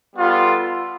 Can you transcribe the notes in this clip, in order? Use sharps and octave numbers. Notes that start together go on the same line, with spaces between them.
G3 B3 F4 A4